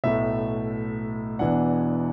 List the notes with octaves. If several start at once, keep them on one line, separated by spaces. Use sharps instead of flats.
B1 A2 A3 E5
E1 E2 E3 D4 F#5